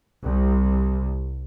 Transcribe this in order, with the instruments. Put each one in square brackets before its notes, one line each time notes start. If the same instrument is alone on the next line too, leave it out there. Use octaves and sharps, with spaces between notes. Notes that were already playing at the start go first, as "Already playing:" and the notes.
[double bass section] C2